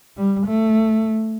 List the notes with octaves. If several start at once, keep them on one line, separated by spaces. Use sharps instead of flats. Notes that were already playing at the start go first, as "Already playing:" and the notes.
G3
A3